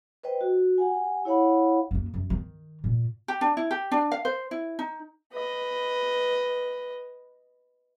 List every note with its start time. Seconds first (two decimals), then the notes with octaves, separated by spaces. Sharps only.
0.23 B4 C5 D#5 G5
0.41 F#4
0.78 G4 F#5 G#5
1.25 E4 C#5 F5 F#5 B5
1.91 F#2 A#3
2.14 F#2
2.30 D#3
2.84 A#2
3.28 G4
3.41 D4
3.57 E4
3.71 G4
3.91 D4
4.12 F5
4.25 C5
4.51 E4
4.79 D#4
5.33 B4 D#5